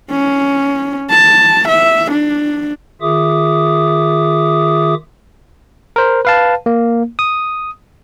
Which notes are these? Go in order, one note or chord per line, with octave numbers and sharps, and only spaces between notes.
C#4
A5
E5
D4
D#3 F4 G#4 E5 D6 D#6
A#4 C5
B4 F5 A5
A#3
D#6